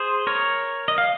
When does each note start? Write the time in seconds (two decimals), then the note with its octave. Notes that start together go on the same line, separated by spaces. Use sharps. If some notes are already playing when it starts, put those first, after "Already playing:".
Already playing: G#4 C5
0.27 A#4 C#5
0.88 D#5
0.98 F5